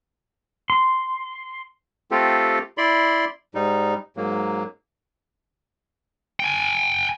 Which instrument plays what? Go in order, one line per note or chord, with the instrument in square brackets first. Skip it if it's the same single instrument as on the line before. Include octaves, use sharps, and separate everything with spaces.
[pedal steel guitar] C6
[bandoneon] A3 C4 F4 G4 A4
E4 D5 B5 C6
G#2 G3 D#4
G#2 F#3 A#3
[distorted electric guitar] G5 G#5